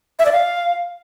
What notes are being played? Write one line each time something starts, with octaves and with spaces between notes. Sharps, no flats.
E5
D5
F5